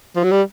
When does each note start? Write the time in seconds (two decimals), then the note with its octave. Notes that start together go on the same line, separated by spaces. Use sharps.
0.16 F3
0.23 F#3
0.31 G3